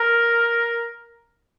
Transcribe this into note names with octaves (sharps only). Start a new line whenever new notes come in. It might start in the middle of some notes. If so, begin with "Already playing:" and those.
Already playing: A#4